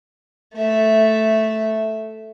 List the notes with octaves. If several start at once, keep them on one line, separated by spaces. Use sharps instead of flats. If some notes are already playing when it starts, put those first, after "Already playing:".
A3 E5